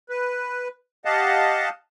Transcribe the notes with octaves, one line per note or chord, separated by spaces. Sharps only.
B4
G4 D#5 F5 F#5 A5